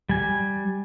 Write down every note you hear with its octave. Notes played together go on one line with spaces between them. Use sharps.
G3 G#5